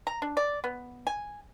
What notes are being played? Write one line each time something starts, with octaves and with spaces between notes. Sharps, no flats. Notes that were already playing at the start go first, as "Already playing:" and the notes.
A#5
D4
D5
B3
G#5